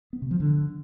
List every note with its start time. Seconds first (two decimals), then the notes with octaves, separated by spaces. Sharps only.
0.13 B3
0.22 C3
0.31 F3
0.40 D3